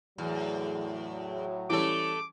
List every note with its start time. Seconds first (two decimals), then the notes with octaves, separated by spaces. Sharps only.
0.18 E2 A2 F#3
1.70 E3 G3 A3 C#4 A4 D6